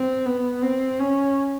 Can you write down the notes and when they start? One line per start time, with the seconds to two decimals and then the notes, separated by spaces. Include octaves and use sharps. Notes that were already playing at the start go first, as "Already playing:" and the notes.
Already playing: C4
0.26 B3
0.62 C4
0.99 C#4